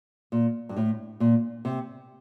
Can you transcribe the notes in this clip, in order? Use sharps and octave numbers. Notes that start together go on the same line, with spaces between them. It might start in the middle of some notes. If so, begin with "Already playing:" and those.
A#2
G2
A2
A#2
C3